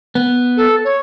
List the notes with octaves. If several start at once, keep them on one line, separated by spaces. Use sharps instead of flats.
B3
A4
C#5